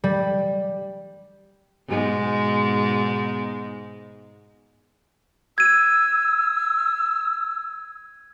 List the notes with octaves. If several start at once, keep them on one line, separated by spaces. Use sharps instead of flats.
G3
G#2 B2 G#3
E6 G#6 D#7